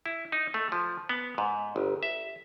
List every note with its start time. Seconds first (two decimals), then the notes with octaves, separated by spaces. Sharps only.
0.06 E4
0.32 D#4
0.54 A3
0.72 F3
1.09 B3
1.38 G#2
1.76 G1
2.03 E5